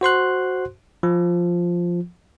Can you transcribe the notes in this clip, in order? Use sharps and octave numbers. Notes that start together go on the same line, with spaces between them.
F#4 C5 C6 F#6
F3